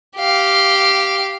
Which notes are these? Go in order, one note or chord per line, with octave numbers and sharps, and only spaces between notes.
G4 F5